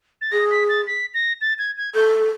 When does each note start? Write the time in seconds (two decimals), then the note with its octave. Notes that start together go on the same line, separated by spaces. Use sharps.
0.21 A6
0.32 G#4 A#6
0.51 B6
0.69 A6
0.87 B6
1.14 A#6
1.41 A6
1.58 G#6
1.77 G#6
1.95 A4 G6